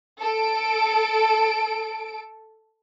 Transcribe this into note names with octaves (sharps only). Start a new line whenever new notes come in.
A4 D7